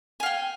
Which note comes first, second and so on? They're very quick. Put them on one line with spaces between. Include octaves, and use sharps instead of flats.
G#5 F5 G5